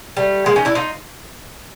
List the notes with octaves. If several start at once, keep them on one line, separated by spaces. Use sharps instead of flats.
G3 A3
G#3 A#3
C#4 D#4
D4 E4
D#4 F4